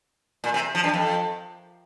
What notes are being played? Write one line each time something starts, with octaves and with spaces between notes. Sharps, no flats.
A#2
C3
F3
G2
F2